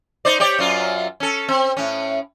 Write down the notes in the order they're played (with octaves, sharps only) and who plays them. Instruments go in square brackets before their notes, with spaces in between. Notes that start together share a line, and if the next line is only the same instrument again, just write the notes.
[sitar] D#4 C5 D5
G4 C#5 D5
F#2 F#3 F4
C#4 A4
C4
A2 C#4